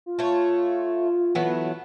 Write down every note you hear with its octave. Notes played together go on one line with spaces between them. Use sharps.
F4
A3 C#5
E3 F#3 A3 B3